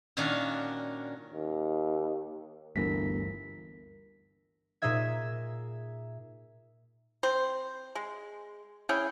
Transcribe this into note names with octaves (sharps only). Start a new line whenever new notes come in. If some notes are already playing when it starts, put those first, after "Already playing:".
A#2 D#3 C#4 D4 F#4 F5
D#2
G1 D2 G2 E3 A#4 A#6 B6
A#2 D#4 G#4 E5 G#6
C4 C5
G#3
C#4 E4 G#4 G5